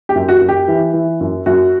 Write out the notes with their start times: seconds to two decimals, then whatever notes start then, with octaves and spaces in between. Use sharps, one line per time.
0.09 G4
0.15 F#2
0.29 F#4
0.41 F#2
0.49 G4
0.68 E3
0.93 E3
1.21 F#2
1.46 F#2 F#4